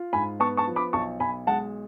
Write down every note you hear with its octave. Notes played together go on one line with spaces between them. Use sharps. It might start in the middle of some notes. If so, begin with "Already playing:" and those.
Already playing: F4
G#2 G#5 B5
B3 A5 C#6
A5 C#6
F3
B5 D6
B1 A5 C#6
B1 G#5 B5
G#3 F#5 A5